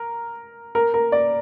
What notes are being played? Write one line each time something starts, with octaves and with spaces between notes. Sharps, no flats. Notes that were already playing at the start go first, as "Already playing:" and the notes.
Already playing: A#4
A#4
A#4
D5